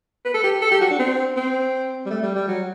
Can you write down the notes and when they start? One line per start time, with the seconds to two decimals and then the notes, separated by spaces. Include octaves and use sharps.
0.25 B4
0.34 A4
0.44 G4
0.62 A4
0.71 G4
0.81 F#4
0.90 D4
0.99 C4
1.36 C4
2.06 G3
2.10 A3
2.23 G3
2.35 G3
2.48 F#3